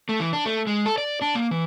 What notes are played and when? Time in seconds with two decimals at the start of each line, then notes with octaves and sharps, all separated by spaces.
0.09 A3
0.20 E3
0.33 D4
0.45 A3
0.67 G#3
0.86 A4
0.98 D5
1.22 D4
1.35 A#3
1.51 E3